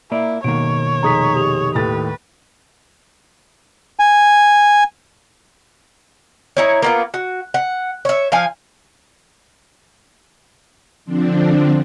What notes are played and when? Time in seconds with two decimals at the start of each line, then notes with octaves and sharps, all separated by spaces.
0.12 A#3 E4 D5
0.44 B2 D#3 A#3 C#5 D7
1.03 F1 D#4 G#4 A#5 D#6 B6
1.35 G4 D#6 F7
1.75 D#2 A2 B4 A6
3.99 G#5
6.57 D#4 E4 C#5
6.82 A#3 B3 F4
7.14 F#4
7.54 F#5
8.05 C#5 E5
8.32 F3 F5 G#5
11.05 D3 F3 C4 D4